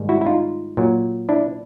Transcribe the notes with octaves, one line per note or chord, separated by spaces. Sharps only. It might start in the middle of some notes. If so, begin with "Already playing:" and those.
Already playing: G#2 D#3 G3
E4 F#4
E4
D#4 F4
A#2 F#3
D4 E4